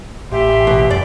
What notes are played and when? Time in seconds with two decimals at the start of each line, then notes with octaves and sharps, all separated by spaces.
0.31 A1 G4 E5 C6
0.67 B2
0.90 F#2 D5